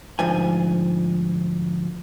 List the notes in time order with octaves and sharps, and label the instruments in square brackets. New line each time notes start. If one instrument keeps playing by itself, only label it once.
[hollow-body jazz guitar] D2 G#2 F3 G#5